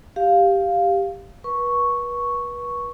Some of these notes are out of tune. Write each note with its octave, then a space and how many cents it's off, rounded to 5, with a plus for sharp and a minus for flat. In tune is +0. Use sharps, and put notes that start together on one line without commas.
G4 +0 F5 +0
B4 -35 C#6 +0